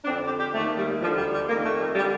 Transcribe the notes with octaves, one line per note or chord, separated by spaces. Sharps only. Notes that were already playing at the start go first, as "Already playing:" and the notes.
D4
F2 D3 C4
G4
G4
D#2 D#3 A3
G3
D2 D3 F3
G3
G3
F2 D#3 A#3
A3
G3
D3 G3